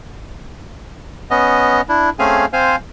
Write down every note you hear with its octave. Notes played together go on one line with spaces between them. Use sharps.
B3 C#4 D#5
D4 E4
A3 C4 C#4 G#4 F5 G#5
C4 C5 F5 G#5